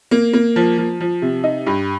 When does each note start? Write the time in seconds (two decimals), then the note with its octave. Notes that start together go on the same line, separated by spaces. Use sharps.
0.11 A#3
0.33 A#3
0.56 F3
0.78 F3
1.00 F3
1.22 C3
1.44 D#4
1.67 G2